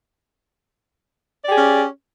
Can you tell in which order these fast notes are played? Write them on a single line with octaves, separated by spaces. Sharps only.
D5 G4 G#4 C#4